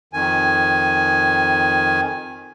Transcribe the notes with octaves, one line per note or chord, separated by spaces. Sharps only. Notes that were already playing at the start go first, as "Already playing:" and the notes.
F2 D#3 G#5